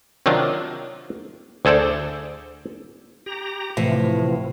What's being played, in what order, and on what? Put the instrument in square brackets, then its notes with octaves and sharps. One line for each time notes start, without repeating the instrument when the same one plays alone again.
[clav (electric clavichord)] C3 D#3 F#3 D4 F4
D2 G#4 A4 C5 D5
[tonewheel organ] G4 A#5
[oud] A2 [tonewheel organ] C3 E3 F3